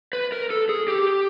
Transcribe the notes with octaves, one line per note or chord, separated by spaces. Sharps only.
B4
A#4
A4
G#4
G4